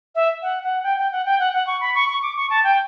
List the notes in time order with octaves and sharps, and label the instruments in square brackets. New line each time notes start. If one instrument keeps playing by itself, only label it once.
[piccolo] E5
F#5
F#5
G5
G5
F#5
G5
F#5
F#5
C#6
B5
C#6
C#6
D6
C#6
A5
G5